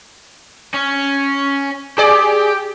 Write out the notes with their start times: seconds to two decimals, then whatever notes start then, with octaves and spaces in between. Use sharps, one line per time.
0.74 C#4
1.98 G4 G#4 D5 G5